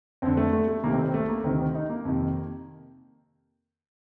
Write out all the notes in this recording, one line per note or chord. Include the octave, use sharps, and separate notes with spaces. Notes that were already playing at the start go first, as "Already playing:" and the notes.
F2 D3 C4
A3
A3
A3
C2 C3 D#3 A#3
C4
C4
A3
A#3
D2 C3 D#3 C4
D#4
A#3
F2 C3 D#3